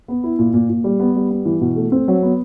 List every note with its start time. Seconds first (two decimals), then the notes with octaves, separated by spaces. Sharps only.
0.08 B3
0.24 E4
0.39 A#2
0.54 A#2
0.69 A#2
0.84 G3
1.00 B3
1.16 G3
1.30 B3
1.45 E3
1.61 B2
1.76 A3
1.92 C4
2.08 F#3
2.23 B3